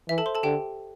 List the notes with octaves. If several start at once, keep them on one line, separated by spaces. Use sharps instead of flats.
E3 E5
A4 A5
C5 C6
A4 A5
D3 G4 G5